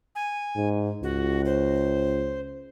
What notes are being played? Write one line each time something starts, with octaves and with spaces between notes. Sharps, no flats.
G#5
G#2
C#2 F#4
C5